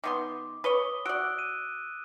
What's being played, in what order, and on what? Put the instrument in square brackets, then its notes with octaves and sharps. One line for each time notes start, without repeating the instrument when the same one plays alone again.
[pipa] D#3 B3 C6 [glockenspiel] D6
[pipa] B4 C#5 [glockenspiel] D#6 G7
[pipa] F#4 D5 [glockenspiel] E6 F#6 D7
[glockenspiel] D#7